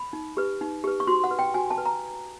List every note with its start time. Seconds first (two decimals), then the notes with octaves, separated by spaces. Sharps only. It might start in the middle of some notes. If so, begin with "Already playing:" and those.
Already playing: B5
0.13 D#4
0.37 G4 B4
0.61 D#4
0.84 G4 B4
1.00 C#6
1.07 F#4 C6
1.24 F#5
1.31 B4
1.39 G5
1.54 F#4 G#5
1.71 A5
1.78 B4
1.86 A#5